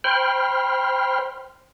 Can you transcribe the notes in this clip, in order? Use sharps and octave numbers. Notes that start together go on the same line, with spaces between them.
C5 G5 B5 C6 F6